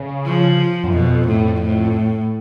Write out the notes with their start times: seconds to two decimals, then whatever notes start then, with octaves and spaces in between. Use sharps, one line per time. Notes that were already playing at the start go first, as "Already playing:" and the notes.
Already playing: C#3
0.25 F3
0.84 F#2
0.93 F2 B2
1.28 A2
1.62 A2